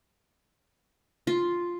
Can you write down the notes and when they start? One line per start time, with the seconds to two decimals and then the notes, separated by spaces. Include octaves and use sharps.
1.27 F4